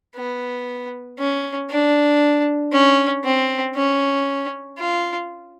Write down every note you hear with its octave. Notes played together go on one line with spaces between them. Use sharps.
B3
C#4
D4
C#4
C4
C#4
F4